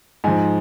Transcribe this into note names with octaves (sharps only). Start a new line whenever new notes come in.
G#2 F3 G#5